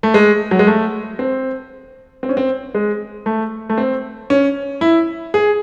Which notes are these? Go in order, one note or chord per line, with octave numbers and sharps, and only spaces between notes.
A3
G#3
F#3
G#3
A3
C4
C4
C#4
C4
G#3
A3
A3
C4
C#4
E4
G#4